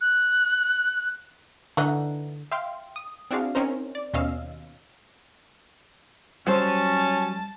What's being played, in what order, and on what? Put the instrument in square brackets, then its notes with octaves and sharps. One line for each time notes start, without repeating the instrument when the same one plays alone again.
[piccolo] F#6
[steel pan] D3 [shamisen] E3 D#4 F#5
[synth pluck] E5 F5 G5 C6
D#6
C4 D4 E4 F#4 G#4 F5
C4 C#4 D#4 A#4 C5
D5
D#2 B2 C#4 D#5 F5 E6
[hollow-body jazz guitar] F#3 C5 [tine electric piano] G3 [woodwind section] C#4 [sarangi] A5